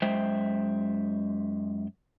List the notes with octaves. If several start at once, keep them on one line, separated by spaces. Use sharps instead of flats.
F#2 G#3 C5 E5 G5